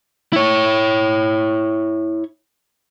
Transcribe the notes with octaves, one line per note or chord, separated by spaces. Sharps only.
E4 C#5